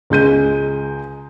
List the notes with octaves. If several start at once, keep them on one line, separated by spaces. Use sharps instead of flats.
C#2 G#3 G6 D#7